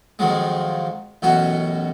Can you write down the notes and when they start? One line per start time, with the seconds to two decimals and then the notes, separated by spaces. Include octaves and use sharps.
0.19 F2 D#3 F3 F#3 G#3
1.22 A1 F#2 B2 C#4 F#4